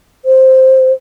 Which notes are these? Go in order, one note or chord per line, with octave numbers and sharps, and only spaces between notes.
C5